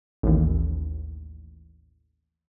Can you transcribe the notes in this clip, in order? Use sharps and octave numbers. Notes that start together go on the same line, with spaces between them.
A1 D#2